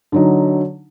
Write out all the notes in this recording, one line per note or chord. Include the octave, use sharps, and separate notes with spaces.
D3 F#3 D#4